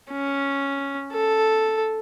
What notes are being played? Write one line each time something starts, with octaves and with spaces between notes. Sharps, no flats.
C#4
A4